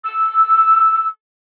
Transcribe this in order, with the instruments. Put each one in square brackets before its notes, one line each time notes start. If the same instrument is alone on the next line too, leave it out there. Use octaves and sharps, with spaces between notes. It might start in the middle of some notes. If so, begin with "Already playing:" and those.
[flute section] E6